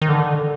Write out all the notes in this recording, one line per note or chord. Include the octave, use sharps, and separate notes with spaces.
D#3
D3